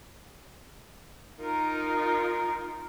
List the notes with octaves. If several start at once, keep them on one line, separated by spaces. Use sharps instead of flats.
D#4 F4 A#4